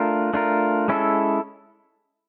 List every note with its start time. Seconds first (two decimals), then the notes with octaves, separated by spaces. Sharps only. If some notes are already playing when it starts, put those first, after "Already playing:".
Already playing: A3 D4 F4 A#4
0.34 A3 D4 F4 A#4
0.88 G#3 C#4 E4 A4